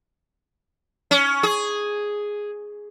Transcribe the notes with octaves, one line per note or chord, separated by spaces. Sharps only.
C#4
G#4